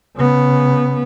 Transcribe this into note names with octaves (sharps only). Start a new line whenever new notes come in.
C#3 B3